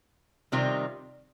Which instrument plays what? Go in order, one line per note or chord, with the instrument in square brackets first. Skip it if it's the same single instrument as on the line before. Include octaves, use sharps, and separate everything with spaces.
[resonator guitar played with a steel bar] C3 D#3 G3 C4 F4